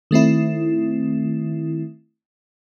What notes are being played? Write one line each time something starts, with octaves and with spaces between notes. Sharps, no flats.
D#3 A3 C4 E4